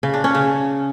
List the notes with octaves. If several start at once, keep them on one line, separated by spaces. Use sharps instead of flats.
C#3
D4
C#4
C#3